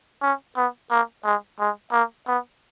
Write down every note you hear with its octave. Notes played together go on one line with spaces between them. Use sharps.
C#4
B3
A#3
G#3
G#3
A#3
B3